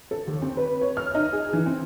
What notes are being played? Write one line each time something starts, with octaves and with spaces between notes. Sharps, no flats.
A4
D#2
C4
B4
C#5
F6
D#4
G#4
E3
C4